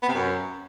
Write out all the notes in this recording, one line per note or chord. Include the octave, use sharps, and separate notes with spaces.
B3
C3
F#2